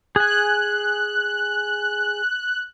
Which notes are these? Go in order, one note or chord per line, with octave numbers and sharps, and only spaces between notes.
G#4 G#5 F#6